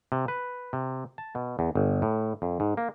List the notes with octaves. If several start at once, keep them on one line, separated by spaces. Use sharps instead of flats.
C3
B4
C3
A5
B2
E2
G1
A2
F2
G#2
A#3